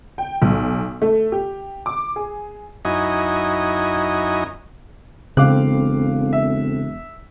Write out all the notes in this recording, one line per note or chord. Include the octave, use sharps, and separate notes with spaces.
G5
B1
A3
G4
D6
G#4
F#2 D#4 E4 F#4 D#5 G#5
E1 C#3 C4 A4 F5 D6 F#6
E5